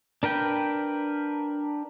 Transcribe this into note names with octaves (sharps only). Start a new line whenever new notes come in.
D4 A#4 B4 G5